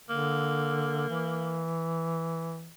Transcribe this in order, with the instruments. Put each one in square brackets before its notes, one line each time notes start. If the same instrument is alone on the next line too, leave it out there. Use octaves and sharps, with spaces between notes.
[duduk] D3 [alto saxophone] A#3
[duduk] E3